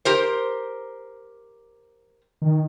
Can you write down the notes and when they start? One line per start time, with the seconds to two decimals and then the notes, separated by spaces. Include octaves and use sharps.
0.05 G4 A#4 C5
2.42 D#3